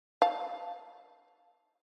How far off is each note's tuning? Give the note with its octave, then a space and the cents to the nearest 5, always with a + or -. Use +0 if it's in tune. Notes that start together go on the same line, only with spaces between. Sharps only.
F5 +0 A5 +0